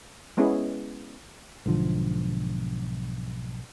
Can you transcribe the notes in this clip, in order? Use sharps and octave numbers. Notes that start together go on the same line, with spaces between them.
G#3 B3 C#4 E4 G#4
B1 G#2 D3 F3